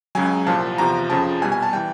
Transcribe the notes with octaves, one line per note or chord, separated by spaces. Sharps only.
C#2 C#3 F#3 G#5
C2 A#2 F3 A5
E2 C3 F3 A#5
F2 C#3 F3 A5
C2 B2 G3 G#5
G#5
A5
E3 G3 G5